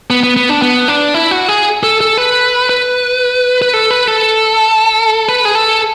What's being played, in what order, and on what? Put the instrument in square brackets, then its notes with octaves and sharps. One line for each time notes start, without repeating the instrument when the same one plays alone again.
[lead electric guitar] B3
B3
B3
D4
B3
D4
E4
F#4
G#4
A4
A4
B4
B4
B4
A4
B4
A4
B4
G#4
A4